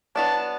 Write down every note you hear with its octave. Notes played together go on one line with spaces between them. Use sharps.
F#3 B3 D4 A5